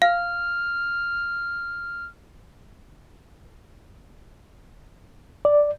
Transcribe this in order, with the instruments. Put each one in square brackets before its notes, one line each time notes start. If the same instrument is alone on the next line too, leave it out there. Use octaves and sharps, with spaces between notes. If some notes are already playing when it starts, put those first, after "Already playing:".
[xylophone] F5 [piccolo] F6
[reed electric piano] D5